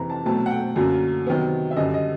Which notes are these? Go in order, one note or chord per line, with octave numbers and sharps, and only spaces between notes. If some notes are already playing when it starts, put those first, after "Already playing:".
Already playing: F2 C3 E3 A#5
A5
B2 F#3 A3 C4 A5
F#5
G5
F#2 D3 F#3 A#3
C3 D#3 F#3 B3
E5
F#2 D3 G3 D#5
D#5